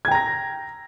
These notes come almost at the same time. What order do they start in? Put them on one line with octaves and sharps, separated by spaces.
G#6 G5 A#5 A#6